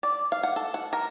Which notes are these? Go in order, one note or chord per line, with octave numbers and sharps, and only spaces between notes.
D5
F5
F#5
A4
F#5
A#4